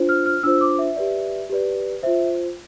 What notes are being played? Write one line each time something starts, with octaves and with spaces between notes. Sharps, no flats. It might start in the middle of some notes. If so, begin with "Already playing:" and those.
Already playing: D4 F4 C5
F6
F6
D4 F4 C5 E6
D6
E5
G4 B4 D5
G4 B4 D5
F4 C5 E5